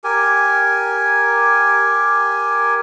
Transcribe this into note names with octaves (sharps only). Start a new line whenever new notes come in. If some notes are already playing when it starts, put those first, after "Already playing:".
G4 A#4 G#5